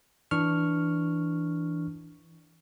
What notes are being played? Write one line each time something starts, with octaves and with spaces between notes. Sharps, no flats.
E3 D4 C#6 F6